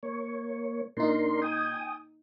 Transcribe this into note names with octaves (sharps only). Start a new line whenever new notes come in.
A#3 C#5
A#2 D4 D#4 A#4 C6
G5 G#5 D#6